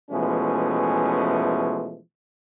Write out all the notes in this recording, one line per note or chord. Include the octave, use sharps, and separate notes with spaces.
B2 E3 F3 G#3 A3 C#4